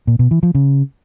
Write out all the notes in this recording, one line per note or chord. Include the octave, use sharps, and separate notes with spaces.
A#2
B2
E3
F3
C#3